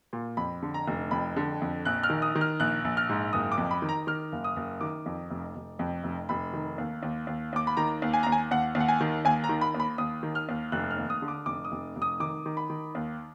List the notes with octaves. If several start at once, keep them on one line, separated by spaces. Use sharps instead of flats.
A#2
F2 B5
D3
A#5
F1
F2 B5
D3
F2
A#1 F#6
F6
D#3
D#6
D#3
F6
A#1 F#6
A#1
F6
G#2
F#1 D#6
D6
F2
B5
D#3
A#5
D#3 F6
F#1
D#6
F#1
D#3 D6
F2
F1
F1
F2
F1
F1 B5
D#3
D#2
D#2
D#2
D#2 D6
B5
D#3 A#5
D#2
G#5
D#2 A#5
G#5
D#2 F#5
D#2
F#5
G#5
D#3
D#2 G#5
A#5
D#3
B5
D#2
B5
D#2 D#6
D#3
F6
D#2
F1 F#6
F6
D#2
D#6
D3
D6
F1 D6
D#6
F1
F1
D#6
D#3 D6
D#3
B5
D#3
D#2